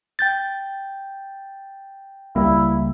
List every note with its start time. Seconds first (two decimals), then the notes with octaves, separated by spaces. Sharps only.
0.19 G5 G6 A6
2.36 C#2 G3 A#3 E4